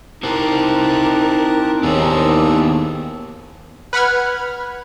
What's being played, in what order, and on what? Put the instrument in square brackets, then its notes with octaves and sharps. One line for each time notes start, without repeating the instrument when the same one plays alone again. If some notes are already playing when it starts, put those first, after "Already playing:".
[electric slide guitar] C4 E4 C5 [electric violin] D#4 A#4 [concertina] G4 A5 F#6
[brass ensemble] D#2 [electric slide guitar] B3 E4 C5 [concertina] D4 G#4 E6
[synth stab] B4 F#5 B5 F6 G#6